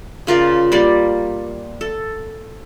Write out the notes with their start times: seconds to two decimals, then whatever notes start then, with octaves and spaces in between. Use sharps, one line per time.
0.27 C#3 F4 A#4 D5
0.72 G3 A#3 D5
1.81 A4